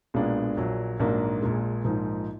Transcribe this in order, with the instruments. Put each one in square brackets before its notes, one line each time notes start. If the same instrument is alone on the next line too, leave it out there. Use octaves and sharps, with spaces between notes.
[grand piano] B1 A#2 G#3 B3 D4
A#1 A#2 F#3
A#1 G#2 F#3 A#3 D4
A#1 A#2 G#3
A#1 G#2 F3 A#3 D#4